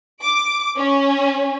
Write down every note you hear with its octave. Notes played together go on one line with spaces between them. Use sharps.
D6
C#4